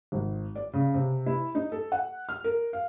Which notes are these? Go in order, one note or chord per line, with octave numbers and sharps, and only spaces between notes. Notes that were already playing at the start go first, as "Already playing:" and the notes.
G#1
D5
C#3
C3
E4
D#4
A4
F#5
F6
A#4
F5